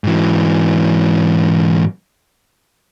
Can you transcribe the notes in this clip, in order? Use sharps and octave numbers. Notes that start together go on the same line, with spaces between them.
G#2 E3